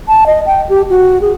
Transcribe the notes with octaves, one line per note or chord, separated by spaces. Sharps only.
A5
D#5
G5
G4
F#4
G#4